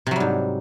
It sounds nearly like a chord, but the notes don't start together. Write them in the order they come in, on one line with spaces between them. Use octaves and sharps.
C3 F#3 G3 G#2